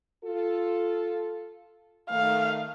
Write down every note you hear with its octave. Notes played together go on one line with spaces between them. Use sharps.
F4 A4
D#3 A3 F5